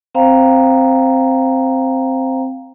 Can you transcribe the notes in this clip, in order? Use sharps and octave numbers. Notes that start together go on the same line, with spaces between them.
C4 C5 F5 G5 A#5